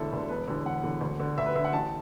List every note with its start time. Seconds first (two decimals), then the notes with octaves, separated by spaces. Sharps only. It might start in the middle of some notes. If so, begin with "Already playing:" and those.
Already playing: E1 D2 D3 D4 E4 A4
0.12 D2 D3
0.29 E1 B4
0.48 E2 D3
0.65 E1 F#5
0.84 E2 D3
1.01 D2
1.20 D3
1.38 D2 E5
1.46 B4
1.55 D3 E5
1.64 F#5
1.73 A1 A5